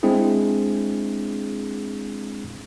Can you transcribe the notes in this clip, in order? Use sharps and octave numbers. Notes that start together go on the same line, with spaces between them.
G#3 C4 D4 E4 G#4